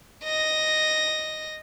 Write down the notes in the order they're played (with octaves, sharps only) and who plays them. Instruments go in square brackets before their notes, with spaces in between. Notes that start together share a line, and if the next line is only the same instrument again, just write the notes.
[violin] D#5 A#6